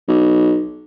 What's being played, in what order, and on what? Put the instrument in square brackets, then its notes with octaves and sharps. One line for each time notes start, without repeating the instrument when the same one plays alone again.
[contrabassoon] B1